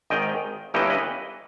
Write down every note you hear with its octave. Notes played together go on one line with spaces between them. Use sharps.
G#1 G#2 D#3 D#5 G5
G1 G2 E3 A#3 C#4 D#5 G5
B4 D#5